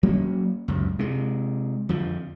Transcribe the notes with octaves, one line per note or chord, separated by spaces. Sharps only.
F#3 A#3 B3 C#4
C#2 F#2
C3 G#3
F2 D3 F3